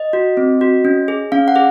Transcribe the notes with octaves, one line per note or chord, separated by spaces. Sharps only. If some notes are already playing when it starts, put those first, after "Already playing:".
Already playing: D#5
F#4
C4
F#4
C#4
G#4
C#4 F5
F#5
G#4